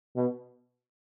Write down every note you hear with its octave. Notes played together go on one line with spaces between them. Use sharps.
B2